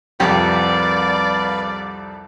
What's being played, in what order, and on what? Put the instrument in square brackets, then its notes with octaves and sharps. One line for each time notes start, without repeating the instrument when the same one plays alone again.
[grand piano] C2 F2 C3 [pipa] G4 [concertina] B4 F5 B5 [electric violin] D5